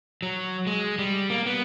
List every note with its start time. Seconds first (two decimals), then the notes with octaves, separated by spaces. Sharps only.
0.22 F#3
0.67 G#3
0.99 G3
1.30 A#3
1.46 B3